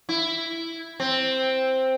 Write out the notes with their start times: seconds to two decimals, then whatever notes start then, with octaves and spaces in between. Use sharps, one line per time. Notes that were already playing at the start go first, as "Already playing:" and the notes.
0.09 E4
1.00 C4